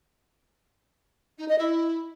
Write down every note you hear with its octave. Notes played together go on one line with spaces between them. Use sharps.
D#4
D#5
E4